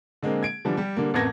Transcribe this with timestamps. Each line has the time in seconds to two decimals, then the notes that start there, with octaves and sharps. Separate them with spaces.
0.23 D3 G#3 A#3 C4
0.43 G#6 D7
0.65 D3 E3 F3 G3
0.77 G3 G4
0.97 D3 G3 A#3
1.14 A1 F2 A#3 B3 G#6 A#6